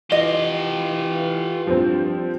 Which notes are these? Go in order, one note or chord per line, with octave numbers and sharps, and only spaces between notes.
E3 F4 G4 D#5
G2 F3 C4